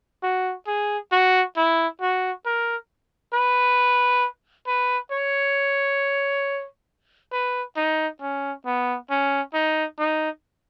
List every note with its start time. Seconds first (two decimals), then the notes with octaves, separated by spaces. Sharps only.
0.23 F#4
0.67 G#4
1.12 F#4
1.56 E4
2.01 F#4
2.45 A#4
3.33 B4
4.67 B4
5.11 C#5
7.32 B4
7.77 D#4
8.21 C#4
8.66 B3
9.10 C#4
9.54 D#4
9.98 D#4